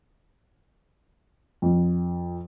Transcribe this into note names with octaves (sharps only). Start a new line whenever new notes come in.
F2